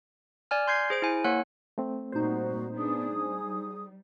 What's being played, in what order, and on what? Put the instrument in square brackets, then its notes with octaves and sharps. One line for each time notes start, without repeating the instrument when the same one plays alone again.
[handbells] D5 G#5 F6
C6 G6 G#6 C7
G#4 C5 D7
E4 G#5
A#3 C#5 F#5 F#6
[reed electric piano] A3 C4
[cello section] A#2 G3 [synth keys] D#4 C5 [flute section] F#4
[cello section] B3 D4 [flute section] G#4 D#6
[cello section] G3